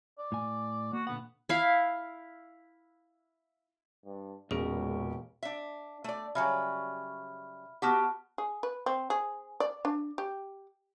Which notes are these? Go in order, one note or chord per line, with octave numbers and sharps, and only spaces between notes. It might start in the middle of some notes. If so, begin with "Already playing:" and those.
D5
A2 G#5
A#3 F#4
A#2 D3 B3 F#5
E4 F5
G2
E1 C#2 A#2 C#4 G#4 A#4
D4 E5
A3 D5
C#3 F#3 G3 E5 B5 F6
B3 F#4 G4 F#5 A5 F6
G#4
B4
C4
G#4
D5
D4
G4